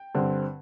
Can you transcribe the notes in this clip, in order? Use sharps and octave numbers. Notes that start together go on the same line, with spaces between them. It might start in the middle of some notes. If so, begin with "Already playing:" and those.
Already playing: G5
G2 D3 C4